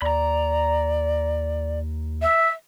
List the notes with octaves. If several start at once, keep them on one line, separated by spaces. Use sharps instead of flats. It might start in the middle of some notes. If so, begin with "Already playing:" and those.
D#2 D5 A#5 B5
E5